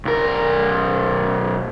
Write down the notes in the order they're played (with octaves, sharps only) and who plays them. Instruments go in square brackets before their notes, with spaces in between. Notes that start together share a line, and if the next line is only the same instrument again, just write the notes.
[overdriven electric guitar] B1 A#4